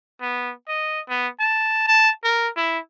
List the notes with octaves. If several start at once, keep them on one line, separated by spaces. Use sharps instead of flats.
B3
D#5
B3
A5
A5
A#4
E4